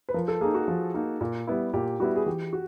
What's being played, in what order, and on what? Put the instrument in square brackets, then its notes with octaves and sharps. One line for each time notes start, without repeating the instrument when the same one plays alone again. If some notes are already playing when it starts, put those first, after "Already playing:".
[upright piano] B4
[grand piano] F3 [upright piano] A#4
[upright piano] A4
[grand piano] A#3 [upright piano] G#4
[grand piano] D#4
[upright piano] F#4
[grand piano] F3
A#3 D#4
A#2
G3 B3 E4
[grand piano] A#2 [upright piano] G4
[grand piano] G3 B3 E4 [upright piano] F#4
[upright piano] G#4
[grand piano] E3 [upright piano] G4
[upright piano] F#4